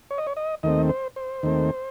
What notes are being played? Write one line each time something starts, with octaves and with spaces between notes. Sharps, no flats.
C#5
D#5
C#5
D#5
D#2 D#3 A3 C4 D#5
C5
C5
D#2 D#3 A3 C4